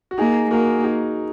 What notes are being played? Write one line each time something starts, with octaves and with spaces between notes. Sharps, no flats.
F#4
A#3 D#4 G#4
A#3 F#4 A#4
D#4 G#4